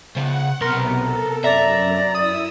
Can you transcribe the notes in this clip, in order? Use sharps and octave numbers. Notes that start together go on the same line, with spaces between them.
C#3 C5 F#5
B1 C3 B3 A#4 C6
A4
F#2 D5 E5 A#5
E4 D#6 E6